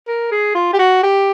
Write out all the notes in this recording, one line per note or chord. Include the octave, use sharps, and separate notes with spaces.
A#4
G#4
F4
G4
F#4
G4